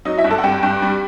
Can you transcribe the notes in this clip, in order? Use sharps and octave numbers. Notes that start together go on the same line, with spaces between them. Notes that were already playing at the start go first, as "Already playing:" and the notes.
F#3 D#4 D#5
E4 E5
G2
A4 A5
F#5
G2 G4 G5
G2
G3